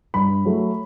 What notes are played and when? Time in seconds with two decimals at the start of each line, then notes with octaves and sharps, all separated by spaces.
0.14 G2 B5
0.45 F#3 A3